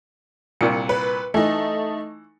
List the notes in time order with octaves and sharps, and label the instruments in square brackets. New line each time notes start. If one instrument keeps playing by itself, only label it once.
[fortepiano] C2 A#2 [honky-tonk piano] C#7
[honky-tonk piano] B4
[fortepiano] E3 [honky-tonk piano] A3 D#4